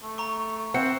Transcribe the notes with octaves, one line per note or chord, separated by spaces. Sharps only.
A3
A#5 C#6
C4 C5 E5 F#5 C#7